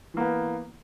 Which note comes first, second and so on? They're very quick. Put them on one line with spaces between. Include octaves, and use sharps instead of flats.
E3 A#3 B3